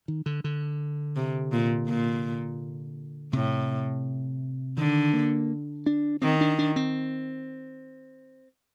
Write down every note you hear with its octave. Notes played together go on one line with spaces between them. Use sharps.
D#3
D3
D3
C3
A#2
A#2
A2 C3
D3 D#3
A#3
D4
D#3 C4
D4
D4
C4